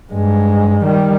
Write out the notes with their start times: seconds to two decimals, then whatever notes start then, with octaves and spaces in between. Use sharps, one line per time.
0.12 G2 G#3
0.84 D#3 G3